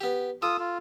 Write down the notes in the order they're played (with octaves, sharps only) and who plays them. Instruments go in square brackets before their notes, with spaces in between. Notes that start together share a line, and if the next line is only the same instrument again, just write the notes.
[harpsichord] B3 G4
[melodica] F4 D#6 [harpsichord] A4
[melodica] F4